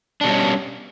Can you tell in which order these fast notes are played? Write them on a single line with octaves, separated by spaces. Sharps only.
D4 B2 G3 C#4